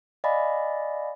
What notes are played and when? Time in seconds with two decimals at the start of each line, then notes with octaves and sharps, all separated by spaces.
0.24 D5 D#5 F5 G#5 B5